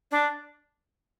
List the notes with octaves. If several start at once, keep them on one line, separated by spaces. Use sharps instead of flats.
D4